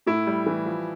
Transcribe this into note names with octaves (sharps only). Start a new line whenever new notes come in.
A2 E4
G3
E3
F3